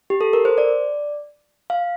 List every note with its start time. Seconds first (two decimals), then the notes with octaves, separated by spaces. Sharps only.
0.10 G4
0.21 A4
0.33 A#4
0.45 C5
0.58 D5
1.70 F5